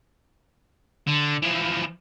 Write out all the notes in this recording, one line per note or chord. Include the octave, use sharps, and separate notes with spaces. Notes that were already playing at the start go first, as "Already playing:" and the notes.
D3
E3 F3